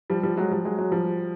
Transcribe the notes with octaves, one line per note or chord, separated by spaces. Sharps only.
F3 G3
F3 G3
F#3 G#3
F3 G3
F#3 G#3
F#3 G#3
F3 G3